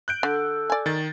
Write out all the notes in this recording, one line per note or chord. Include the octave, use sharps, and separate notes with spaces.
F#6 G6 D7
D3 A4
D5 G#5
D#3 A6